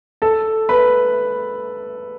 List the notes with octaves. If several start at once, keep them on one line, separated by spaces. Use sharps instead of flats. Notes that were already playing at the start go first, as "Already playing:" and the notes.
A4 A5
B4 B5